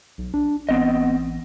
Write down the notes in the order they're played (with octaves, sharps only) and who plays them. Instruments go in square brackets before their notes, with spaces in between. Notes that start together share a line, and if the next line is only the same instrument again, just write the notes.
[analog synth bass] B1
D4
[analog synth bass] A1 [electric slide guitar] B3 C4 D#5